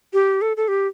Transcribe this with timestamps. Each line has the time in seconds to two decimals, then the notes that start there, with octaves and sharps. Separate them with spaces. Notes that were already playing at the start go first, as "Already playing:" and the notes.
0.13 G4
0.42 A4
0.57 A4
0.68 G4